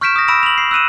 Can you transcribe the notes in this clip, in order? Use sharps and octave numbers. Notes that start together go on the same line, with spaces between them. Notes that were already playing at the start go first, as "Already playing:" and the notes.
C#6 F6 G6 B6 D7 E7
D#6 A#6
B5 E6 A#6 D7 E7
F7 F#7
C7
E6 F#6 D#7 E7